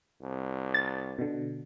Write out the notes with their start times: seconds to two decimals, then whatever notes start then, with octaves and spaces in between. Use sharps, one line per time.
0.22 C2
0.74 A6
1.19 B2 D3